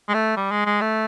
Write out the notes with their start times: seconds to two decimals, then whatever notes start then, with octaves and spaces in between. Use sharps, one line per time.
0.09 G#3
0.14 A3
0.37 G3
0.51 G#3
0.66 G#3
0.81 A3